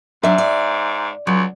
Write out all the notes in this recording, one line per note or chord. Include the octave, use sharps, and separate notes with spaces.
G#2 F#3 D4 E5
D5
C#2 F#3